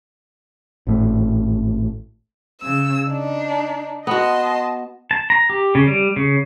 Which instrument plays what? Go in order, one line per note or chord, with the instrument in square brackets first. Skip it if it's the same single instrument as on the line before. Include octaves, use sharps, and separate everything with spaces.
[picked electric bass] G#1 A2
[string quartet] C#3 E6
D4 D#4
[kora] B3 F#4 [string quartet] D#5 A5 C6
[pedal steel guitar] A5
A#5
G4
C#3
G3
C#3